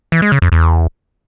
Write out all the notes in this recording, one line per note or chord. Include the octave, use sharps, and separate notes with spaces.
E3
G#3
C#3
F2
E2